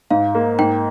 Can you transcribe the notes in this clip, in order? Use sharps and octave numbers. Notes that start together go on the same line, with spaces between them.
G#2 F5
A#3
G#2 G5